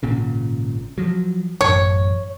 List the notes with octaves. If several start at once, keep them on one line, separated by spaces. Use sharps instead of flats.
G#1 A#2 C#3
F3 F#3
A1 F#2 C#5